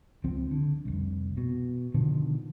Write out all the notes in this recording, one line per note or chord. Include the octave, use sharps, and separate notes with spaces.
C#2 F3 C4
D3
F1 C2
B2
B2 D3 D#3 F3